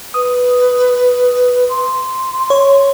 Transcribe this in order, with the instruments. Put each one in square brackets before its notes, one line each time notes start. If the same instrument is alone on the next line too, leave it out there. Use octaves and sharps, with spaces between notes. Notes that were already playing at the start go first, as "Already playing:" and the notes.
[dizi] B4 [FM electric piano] D#6
[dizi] C6
[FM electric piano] C#5